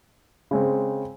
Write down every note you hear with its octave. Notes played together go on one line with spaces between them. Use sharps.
C#3 G#3 C4